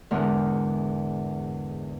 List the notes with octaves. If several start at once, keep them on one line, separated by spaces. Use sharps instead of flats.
E2 G#2 D3 G#3 A#4 F6